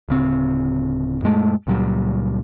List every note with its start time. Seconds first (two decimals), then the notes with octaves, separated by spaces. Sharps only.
0.09 D1 C#3 C4
1.22 F#2 A#2 G#3 A3
1.67 C#2 A#2 F#3 G3